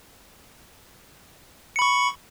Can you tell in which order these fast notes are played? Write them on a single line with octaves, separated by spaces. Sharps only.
C#7 B5 C#6